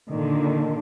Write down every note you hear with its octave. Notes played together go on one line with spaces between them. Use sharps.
A#2 D3 D#3